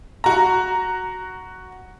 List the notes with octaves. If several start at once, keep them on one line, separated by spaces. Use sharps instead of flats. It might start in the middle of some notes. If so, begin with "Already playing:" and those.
F#4 A#5